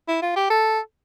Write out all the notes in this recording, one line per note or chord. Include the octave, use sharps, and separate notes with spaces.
E4
F4
G4
A4